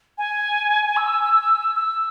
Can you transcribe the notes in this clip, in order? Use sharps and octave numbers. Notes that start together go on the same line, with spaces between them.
G#5
E6
E6